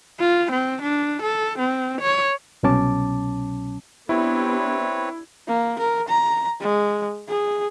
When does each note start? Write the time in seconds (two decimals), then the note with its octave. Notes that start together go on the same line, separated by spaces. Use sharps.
0.20 F4
0.51 C4
0.82 D4
1.22 A4
1.58 C4
2.01 C#5
2.63 C2 B2 F#3 C#4 A5 D6
4.09 B3 C4 D4 E4 G4 B4 C#5
5.47 A#3
5.79 A#4
6.08 A#5
6.60 G#3
7.28 G#4